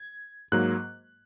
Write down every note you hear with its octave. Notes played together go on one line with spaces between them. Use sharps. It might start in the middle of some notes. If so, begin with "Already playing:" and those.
Already playing: G#6
G#2 F#3 A#3 F#6